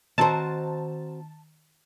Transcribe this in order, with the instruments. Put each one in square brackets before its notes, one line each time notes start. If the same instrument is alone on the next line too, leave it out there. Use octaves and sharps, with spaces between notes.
[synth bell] D#3 [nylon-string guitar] C4 F#4 C5 [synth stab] A5